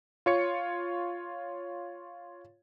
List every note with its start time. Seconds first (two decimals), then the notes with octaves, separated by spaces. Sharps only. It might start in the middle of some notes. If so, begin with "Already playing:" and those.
0.26 F4 C#5 C#7